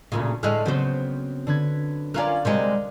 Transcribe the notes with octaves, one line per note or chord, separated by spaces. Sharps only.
D2 A#2 C#3
A2 D3 G#3 F6 F#6
C#3 F#3 B3 C4 C5
D3 B4 G#6
C#4 F4 A#4 D5 F5 F#6
C3 G3 G#3 A#4